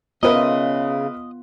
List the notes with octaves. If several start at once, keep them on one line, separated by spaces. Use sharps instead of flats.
C#3 B3 F4 A#4 B4 D#5 E5